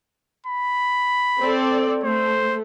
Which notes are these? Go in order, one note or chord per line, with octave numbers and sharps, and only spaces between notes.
B5
C4 A4 D5
A3 C5